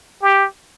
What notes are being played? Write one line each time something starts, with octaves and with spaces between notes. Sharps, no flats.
G4